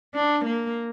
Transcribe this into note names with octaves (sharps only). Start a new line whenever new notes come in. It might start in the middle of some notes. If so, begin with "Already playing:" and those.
D4
A#3